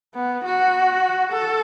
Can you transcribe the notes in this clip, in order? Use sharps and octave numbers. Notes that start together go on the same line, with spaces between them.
B3
F#4
A4